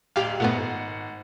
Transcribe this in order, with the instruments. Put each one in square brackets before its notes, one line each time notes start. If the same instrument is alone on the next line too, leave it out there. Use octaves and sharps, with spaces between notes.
[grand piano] D1 F7 [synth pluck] G4 F5
[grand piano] G#1 F#5 [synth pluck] A#2 A3 B3